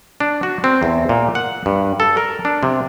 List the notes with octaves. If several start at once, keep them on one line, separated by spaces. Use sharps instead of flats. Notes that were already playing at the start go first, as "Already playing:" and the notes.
D4
F#4
C4
E2
A#2
F#5
G2
A4
A#4
D4
C3